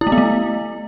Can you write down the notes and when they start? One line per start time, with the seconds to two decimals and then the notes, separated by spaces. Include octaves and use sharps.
0.01 E4
0.07 A3
0.12 B3
0.18 A3